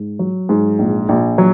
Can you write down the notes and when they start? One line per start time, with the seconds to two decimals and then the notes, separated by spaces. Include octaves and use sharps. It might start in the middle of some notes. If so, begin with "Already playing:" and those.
Already playing: G#2
0.19 F#3
0.49 G#2
0.79 A#1
1.09 A#1
1.38 F#3